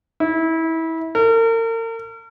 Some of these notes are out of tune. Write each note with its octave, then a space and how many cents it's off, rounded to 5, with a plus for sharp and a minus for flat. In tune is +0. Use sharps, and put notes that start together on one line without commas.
E4 -25
A#4 -40